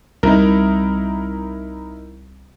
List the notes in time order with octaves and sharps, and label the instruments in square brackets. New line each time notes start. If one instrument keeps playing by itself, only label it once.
[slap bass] C2 [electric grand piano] D#4 E4 A#4